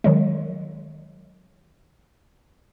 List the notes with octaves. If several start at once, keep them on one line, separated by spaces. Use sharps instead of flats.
D#3 F#3 G#3